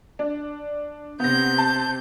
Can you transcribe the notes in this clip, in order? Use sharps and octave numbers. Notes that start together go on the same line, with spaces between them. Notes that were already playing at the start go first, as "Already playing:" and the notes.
D4
C3 B3 G6 A#6
A5